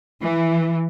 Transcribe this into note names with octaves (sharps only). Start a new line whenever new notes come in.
E3